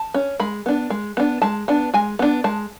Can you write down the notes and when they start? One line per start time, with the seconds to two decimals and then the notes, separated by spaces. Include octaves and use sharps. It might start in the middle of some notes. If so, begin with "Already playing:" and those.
Already playing: A5
0.14 C#4
0.40 G#3 B5
0.66 B3 D4
0.90 G#3
1.17 B3 D4
1.42 G#3 A5
1.68 B3 D4
1.94 G#3 G#5
2.19 B3 D4
2.44 G#3 A5